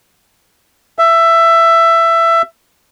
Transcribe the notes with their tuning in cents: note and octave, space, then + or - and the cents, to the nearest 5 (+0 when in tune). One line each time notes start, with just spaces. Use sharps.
E5 +15